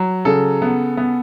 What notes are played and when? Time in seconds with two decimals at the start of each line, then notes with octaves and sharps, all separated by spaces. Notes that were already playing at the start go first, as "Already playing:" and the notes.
Already playing: F#3
0.25 C#3 A4
0.62 B3
0.97 B3